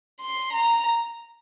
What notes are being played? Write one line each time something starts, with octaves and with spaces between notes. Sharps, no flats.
C6
A#5